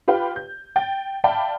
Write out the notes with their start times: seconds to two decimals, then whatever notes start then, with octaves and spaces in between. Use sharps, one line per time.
0.08 F4 G4 B4 F5 G5
0.36 G6
0.76 G5 A6
1.24 D5 E5 F5 G5 A5 B5